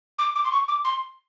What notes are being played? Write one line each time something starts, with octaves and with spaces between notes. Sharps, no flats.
D6
D6
C6
C#6
D6
C6